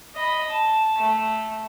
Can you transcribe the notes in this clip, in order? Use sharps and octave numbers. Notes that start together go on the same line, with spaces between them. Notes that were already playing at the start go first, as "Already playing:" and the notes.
D#5 B5
A5
A3